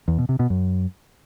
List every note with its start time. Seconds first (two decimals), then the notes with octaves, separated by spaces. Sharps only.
0.08 E2
0.18 B2
0.29 C3
0.39 B2
0.50 F#2